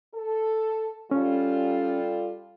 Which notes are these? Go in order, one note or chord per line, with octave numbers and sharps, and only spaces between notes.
A4
G3 C#4 F4 A4